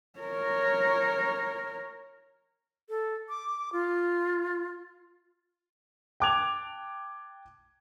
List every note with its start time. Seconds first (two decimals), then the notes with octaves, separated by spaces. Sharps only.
0.19 A#4 C#5
2.89 A4
3.29 D6
3.73 F4
6.20 G5 A5 D6 F#6 G#6 F7